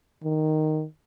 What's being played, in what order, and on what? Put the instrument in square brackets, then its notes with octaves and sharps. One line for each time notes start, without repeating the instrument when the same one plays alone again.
[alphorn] D#3